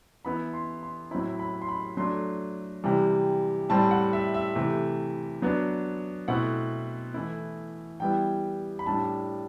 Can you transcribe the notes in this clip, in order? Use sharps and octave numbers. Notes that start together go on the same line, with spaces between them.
E3 B3 E4 B5
C6
C6
A2 F#3 C4 E4 B5
B5
C6
B5
F#3 A3 D4 C6
C3 E3 G3
A2 G3 C4 A5
F#5
E5
E5
C3 E3 A3
F#3 B3 D4
B2 A3 C4 E4 F#5
E3 A3 E4
E3 G3 B3 E4 G5
B5
A2 G3 D4 A5